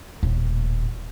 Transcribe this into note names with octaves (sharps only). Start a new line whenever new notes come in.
D#1 A2